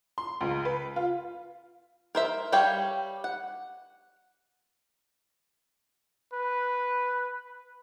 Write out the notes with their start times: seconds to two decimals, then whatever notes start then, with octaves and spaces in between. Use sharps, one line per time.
0.18 C6
0.41 C#2
0.65 B4
0.96 F4
2.15 A#4 C5 E5
2.52 G3 G4 C#5 F5 G5
3.24 F#5
6.33 B4